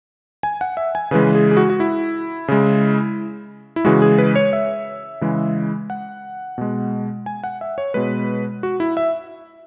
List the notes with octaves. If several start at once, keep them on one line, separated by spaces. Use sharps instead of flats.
G#5
F#5
E5
G#5
C#3 E3 G#3 B4
G#4
G#4
F#4
F#4
E4
C#3 G#3
E4
C#3 E3 G#3 F#4
G#4
B4
C#5
E5
C#3 E3 G#3
F#5
B2 G#3
G#5
F#5
E5
C#5
B2 G#3 B4
F#4
E4
E5